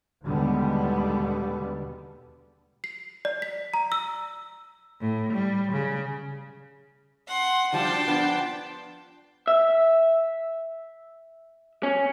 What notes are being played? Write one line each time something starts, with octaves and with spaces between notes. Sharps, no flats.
D#2 B2 D3 G3 G#3 B3
C7
D5
B6
A#5
E6
A2
G3
C#3
F#5 C6
F3 G3 D4 F#4 G5 A5 C6
F3 B3
E5
C#4